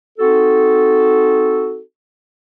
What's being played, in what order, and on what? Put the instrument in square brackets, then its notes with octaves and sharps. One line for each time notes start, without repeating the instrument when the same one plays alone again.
[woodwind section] C4 D#4 F#4 A4